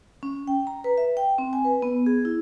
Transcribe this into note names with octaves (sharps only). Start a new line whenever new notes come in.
C#4
G5
A#5
B4
E5
G5
C4
G#5
B4
B3
G#4
E4